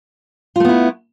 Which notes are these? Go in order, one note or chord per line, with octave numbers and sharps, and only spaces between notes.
A3 B3 E4 F4